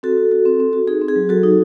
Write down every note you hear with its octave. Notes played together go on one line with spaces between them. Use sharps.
C4 F#4 A4
F#4
F#4
C4
C4
F#4
D#4 G#4
C4
G#4
F#3
F#3 F#4 A4
D#4